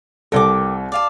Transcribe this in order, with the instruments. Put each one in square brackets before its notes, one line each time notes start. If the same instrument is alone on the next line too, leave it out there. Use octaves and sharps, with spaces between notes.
[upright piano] C2 A4 [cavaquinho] A#4 G5 D6
[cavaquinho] D5 F5 A5